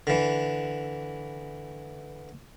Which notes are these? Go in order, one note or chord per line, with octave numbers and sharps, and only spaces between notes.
D3 E3